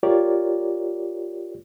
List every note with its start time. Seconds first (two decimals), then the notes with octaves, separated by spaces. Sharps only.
0.03 F4 G4 A#4 C#5 D5